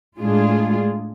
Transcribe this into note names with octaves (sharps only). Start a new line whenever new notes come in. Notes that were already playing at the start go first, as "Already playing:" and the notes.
A2 G#3 D4 F4 G#4